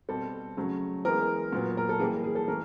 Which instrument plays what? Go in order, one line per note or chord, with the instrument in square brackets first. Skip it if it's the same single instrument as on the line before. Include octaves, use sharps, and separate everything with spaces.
[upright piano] B2 G3 C4 A4
C#3 F#3 A3
E3 G#3 B3 A#4
A#2 F#3 B3
A#4
A4
E3 G3 A#3 G#4
G#4
A4
E3 A3 A#4